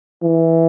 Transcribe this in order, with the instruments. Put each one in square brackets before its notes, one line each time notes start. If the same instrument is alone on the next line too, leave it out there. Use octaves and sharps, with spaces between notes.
[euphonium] E3